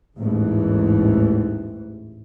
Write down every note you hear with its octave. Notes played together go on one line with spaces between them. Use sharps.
A1 D#2 G#2 E3